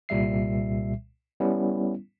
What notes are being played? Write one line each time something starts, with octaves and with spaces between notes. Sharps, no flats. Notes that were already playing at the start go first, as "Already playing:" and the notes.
C2 A#2 G3 E5 C7
G3 B3 C#4 E4